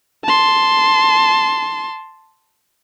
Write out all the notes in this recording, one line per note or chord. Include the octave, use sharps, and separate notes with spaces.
A5 C6